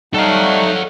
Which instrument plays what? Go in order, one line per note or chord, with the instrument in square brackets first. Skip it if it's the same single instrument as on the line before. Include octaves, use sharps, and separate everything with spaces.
[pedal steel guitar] G3 [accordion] A3 D#4 [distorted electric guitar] A4 F5 [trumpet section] C#5 F#5